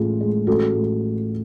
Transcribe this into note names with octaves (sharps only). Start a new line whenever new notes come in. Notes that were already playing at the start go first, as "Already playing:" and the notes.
Already playing: A1 A2 G#3 F4 G#4
G#3
A1 F#4 A4
A2